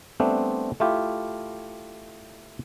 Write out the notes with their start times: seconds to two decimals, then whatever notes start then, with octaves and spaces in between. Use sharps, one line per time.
0.20 G3 A3 B3 C4 D4 C5
0.80 A3 E4 F4 G4